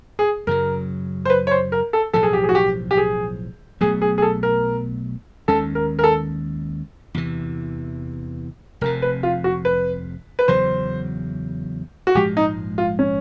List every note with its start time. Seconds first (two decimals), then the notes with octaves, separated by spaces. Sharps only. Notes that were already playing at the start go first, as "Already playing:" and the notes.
0.19 G#4
0.47 F#2 C#3 F#3 A#4
1.25 C5
1.30 B4
1.47 C#5
1.51 C5
1.72 A#4
1.93 A4
2.13 B1 A2 F3 A4
2.23 G#4
2.33 G4
2.43 G#4
2.49 F#4
2.55 G4
2.91 G4
2.97 G#4
3.81 B1 B2 F#3 A3 G#4
4.02 G#4
4.18 G#4
4.22 A4
4.43 A#4
5.48 D#2 D#3 G#3 C#4 A4
5.75 A#4
5.99 A#4
6.03 A4
7.14 E2 C3 E3
8.81 F1 F2 C3 A#4
9.02 B4
9.23 F4
9.44 F#4
9.65 B4
10.39 B4
10.48 E2 C#3 F#3 C5
12.07 F#4
12.15 A#1 G#2 F3 G#3 G4
12.37 D#4
12.78 F4
12.99 C#4